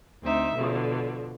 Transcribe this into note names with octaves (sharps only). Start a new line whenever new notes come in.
D2 C4 D#4 E5
B2 D3 F3